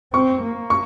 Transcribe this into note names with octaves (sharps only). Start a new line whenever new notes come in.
C4 C#6
A#3
C#6